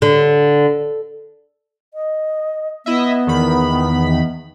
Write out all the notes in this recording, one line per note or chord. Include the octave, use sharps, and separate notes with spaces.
D3
D#5
B3 E4 D#5 E5
E2 D#3 B5